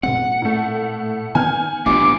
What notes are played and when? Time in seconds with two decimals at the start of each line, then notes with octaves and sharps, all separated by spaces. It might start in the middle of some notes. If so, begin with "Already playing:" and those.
0.03 A#2 G#3 C4 F#5
0.42 A2 A3
1.35 D#3 B3 G#5 F6 G6
1.86 A1 B3 C#4 D4 F4 G4 D6